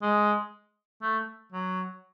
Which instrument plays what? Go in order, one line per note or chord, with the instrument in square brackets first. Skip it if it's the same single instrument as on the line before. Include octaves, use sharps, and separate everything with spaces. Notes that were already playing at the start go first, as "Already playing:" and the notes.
[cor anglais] G#3
A3
F#3